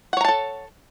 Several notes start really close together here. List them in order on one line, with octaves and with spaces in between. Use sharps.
F#5 C#5 A#5 A5 A4